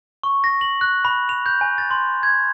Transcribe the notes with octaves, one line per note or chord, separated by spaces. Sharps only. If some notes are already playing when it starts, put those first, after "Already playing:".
C#6
A#6
F#7
F#6
B5
F7
G6
G#5
A6
C6
G#6